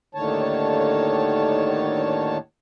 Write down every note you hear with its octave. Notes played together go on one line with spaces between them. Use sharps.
D#2 A2 D3 D#3 C#5 A5